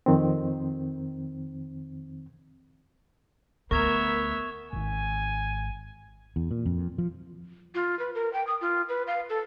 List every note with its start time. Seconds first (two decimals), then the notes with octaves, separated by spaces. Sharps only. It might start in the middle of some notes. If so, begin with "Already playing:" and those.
0.06 F2 D#3 C4
3.71 D2 B3 A#4 E5 C#6 G#6 F7
4.72 D1 G#1 G#5
6.36 E2
6.51 A#2
6.66 F2
6.98 F3
7.75 F4
7.99 B4
8.15 A#4
8.33 G5
8.47 D#6
8.61 F4
8.89 B4
9.07 F5
9.29 A4